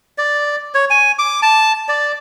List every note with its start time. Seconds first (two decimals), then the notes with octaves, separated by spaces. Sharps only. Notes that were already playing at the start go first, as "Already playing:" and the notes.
0.18 D5
0.74 C#5
0.90 G#5
1.19 D6
1.42 A5
1.88 D5